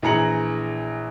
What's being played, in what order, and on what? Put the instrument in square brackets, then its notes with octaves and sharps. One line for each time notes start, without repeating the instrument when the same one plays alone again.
[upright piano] A#1 E3 G#4 A#5 C#7 F#7